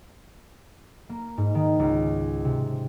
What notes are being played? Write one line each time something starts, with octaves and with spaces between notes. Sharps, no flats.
A#3
G#2
D#3
C#2
C3